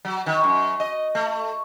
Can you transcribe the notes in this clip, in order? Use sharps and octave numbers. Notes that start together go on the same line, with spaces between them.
F#3
D#3
F#2
D#5
A3